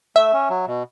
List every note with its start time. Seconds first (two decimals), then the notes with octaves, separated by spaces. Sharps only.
0.16 A3 E5
0.33 C#4
0.50 F#3
0.67 B2